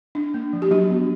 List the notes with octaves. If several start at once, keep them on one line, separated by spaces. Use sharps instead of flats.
D4
A#3
F3
G4
F#3 D4 F#4
B3